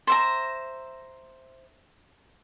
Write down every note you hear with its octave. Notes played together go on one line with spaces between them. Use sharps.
C5 E5 A#5